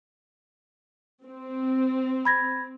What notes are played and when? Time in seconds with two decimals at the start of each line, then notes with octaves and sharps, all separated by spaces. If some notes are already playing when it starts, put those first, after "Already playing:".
1.26 C4
2.25 B5 G#6 A#6